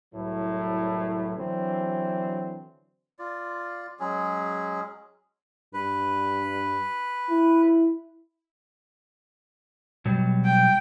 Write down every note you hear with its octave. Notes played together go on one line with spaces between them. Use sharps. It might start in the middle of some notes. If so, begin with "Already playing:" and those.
C2 A2 F#3 B4
D3 E3 F#3 C4
F4 D5
F#3 G#3 C#4 G#4
G2 B4
E4
B2 F#3 G3
G5